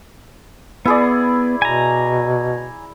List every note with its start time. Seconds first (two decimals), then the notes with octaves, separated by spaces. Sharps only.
0.86 B3 E4 G#4 D5
1.62 B2 G#5 A#5